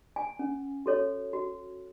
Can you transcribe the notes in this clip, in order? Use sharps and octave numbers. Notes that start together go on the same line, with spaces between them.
G#5
C#4
F#4 A4 C#5
F#4